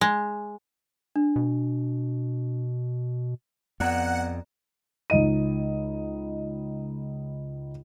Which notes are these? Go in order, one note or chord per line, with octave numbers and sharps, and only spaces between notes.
G#3
D4
B2
F2 B3 D5 F#5 A#5
C#2 D#4 D#5 D#7